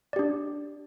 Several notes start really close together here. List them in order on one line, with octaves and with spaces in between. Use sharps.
D5 G4 D4